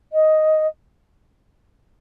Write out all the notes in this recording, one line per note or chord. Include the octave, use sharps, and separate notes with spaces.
D#5